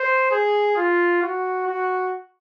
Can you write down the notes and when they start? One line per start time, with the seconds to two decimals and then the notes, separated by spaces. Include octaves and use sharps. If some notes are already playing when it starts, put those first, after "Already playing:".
Already playing: C5
0.31 G#4
0.76 F4
1.22 F#4
1.67 F#4